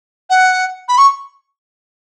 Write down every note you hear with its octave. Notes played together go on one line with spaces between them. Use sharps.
F#5
B5
C#6